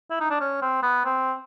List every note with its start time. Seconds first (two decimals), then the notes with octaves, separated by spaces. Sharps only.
0.10 E4
0.20 D#4
0.30 D4
0.40 C#4
0.62 C4
0.83 B3
1.05 C4